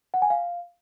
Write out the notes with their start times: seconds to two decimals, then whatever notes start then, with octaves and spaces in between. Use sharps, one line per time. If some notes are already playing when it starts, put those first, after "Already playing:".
0.14 F#5
0.22 G#5
0.30 F5